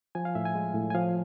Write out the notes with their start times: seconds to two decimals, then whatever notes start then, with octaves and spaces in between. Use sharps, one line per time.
0.15 F3 G#5
0.25 F5
0.35 A2 E5
0.45 G#5
0.55 G#3
0.75 A2
0.90 G#5
0.95 F3 F5